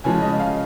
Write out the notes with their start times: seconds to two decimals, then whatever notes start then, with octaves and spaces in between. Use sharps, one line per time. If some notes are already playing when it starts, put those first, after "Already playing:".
0.04 C#3 F3 G#3 G#5
0.22 D#5
0.40 F5